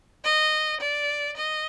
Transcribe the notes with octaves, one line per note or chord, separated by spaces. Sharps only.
D#5
D5
D#5